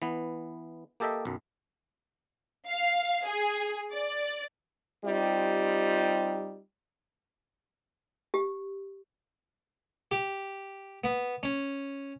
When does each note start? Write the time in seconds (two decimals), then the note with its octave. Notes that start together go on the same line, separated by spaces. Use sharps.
0.02 E3 B3
1.00 A#3 G4 A4 D#5 E5 G5
1.25 B1 F#2
2.68 F5
3.25 G#4
3.93 D5
5.05 G3 C4 D#4 F4 G4
8.34 G4
10.11 G4
11.04 B3
11.43 C#4